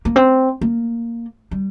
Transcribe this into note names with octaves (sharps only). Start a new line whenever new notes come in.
A#3
C4
A#3
G3